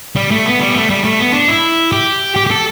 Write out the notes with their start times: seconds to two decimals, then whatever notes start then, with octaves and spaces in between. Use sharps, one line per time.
0.16 G3
0.31 A3
0.46 B3
0.61 G3
0.70 B3
0.76 A3
0.90 G3
1.04 A3
1.19 B3
1.34 D4
1.48 E4
1.92 G4
2.36 G4
2.47 G4
2.51 A4